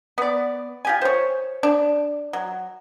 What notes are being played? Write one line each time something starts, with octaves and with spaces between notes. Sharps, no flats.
B3 D5
F4 G4 G#5
C5 C#5
D4
F#3